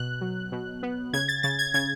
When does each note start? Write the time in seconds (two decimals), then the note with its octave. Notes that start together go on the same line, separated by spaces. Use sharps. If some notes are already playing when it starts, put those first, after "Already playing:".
Already playing: B2 F#6
0.21 F#3
0.52 B2
0.83 B3
1.13 C#3 G#6
1.28 A6
1.43 C#3 A6
1.59 G#6
1.74 C#3 G#6